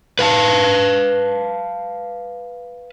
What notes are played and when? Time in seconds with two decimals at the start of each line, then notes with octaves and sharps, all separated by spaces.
0.19 B4 F5 G5 A5